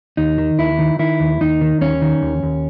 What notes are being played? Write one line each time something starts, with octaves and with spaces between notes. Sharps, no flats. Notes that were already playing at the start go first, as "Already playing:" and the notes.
D#2 D#4
D#3
D#2 E4
D#3
D#3 E4
D#2
D#2 D#4
D#3
D#2 C#4
D#3
D#2
D#2